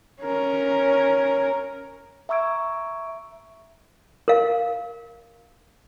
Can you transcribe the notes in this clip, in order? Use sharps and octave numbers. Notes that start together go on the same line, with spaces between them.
C#4 A#4
E5 A#5 C#6 E6 G#6 D7
A#4 F5